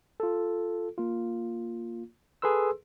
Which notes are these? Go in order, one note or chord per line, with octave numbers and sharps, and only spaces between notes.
F4 A4
A#3 F4
G#4 A4 B4 C6 E6